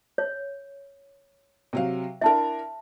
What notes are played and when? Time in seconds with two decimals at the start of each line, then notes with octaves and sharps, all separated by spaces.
0.18 C#5
1.73 C3 F#3 F5
2.21 D4 E4 A#4 E5 A5